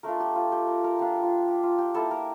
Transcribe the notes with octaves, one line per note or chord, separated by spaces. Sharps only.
A3 D4 F4 A#4
G4
F4
G4
A#4
A#4
G3 D4 F4 G4
F4
G4
F4
G4
A#3 E4 A4
A#4